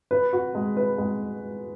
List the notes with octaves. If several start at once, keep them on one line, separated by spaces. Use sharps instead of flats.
B4
F#4
G#3
B4
G#3